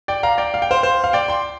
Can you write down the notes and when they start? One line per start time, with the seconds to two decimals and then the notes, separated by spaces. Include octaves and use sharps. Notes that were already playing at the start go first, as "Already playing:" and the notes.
0.08 D5 G5
0.23 F5 A#5
0.38 D5 G5
0.54 F5
0.62 G5
0.71 C5 F5
0.83 C5 F5
1.04 F5
1.13 D5 G5
1.28 G5 C6